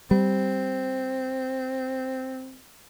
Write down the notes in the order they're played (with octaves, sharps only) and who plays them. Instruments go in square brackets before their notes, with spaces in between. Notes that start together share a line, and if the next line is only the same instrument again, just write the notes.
[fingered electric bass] G3 [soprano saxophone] C4